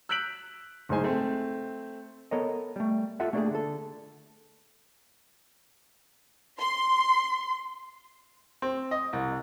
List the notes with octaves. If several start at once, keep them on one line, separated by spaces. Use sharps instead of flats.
E6 F#6 G6 B6 D7 F#7
F#1 G#2 D#4 G#4 C5 G#5
A3 C4
B3 A4 A#4 C#5 D#5
G3 A3
F4 G4 A4 E5 F#5
A3 A#3 D4 F4 G4 G#4
D3 A4
C6
C4
D#5
C2